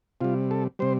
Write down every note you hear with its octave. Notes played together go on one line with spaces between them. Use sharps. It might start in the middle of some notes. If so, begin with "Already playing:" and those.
C3 G3 F4
A4
C3 G3 C5